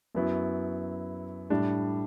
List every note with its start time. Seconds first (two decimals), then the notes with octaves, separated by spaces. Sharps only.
0.15 F#2 F#3 B3 E4
1.50 A2 G3 D4